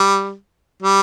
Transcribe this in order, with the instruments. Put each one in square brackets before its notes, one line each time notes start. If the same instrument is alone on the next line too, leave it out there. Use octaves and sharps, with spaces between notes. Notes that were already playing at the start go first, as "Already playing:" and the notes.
Already playing: [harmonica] G3
G3